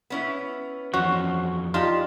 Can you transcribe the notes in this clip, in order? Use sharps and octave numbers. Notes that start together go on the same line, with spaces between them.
B3 C#4 E4
F2 E3 C#4 F#4 C5
D4 D#4 F4 G4